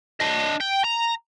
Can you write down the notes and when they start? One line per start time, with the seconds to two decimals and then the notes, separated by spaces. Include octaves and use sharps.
0.20 D4 D#5
0.61 G5
0.84 A#5